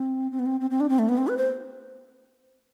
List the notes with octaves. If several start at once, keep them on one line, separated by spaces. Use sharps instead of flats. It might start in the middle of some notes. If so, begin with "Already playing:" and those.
Already playing: C4
C4
B3
C4
C4
C4
D4
C4
A3
B3
C4
B4
C5